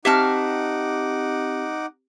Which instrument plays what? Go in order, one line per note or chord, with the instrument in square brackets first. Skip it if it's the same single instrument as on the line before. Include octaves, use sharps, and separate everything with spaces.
[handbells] C4 G4 [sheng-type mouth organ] D#4 F#5 D6 [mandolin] E5 A5 F6